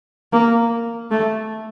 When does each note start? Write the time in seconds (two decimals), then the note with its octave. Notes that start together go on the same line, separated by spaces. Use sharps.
0.33 A#3
1.11 A3